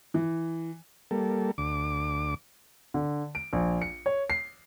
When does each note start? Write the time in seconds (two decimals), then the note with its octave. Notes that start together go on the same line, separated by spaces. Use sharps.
0.14 E3
1.11 G3 A#3 A4
1.58 D2 D6
2.94 D3
3.35 D7
3.53 A#1
3.82 C#7
4.06 C#5
4.30 C7